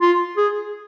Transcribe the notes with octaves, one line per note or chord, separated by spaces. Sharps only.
F4
G#4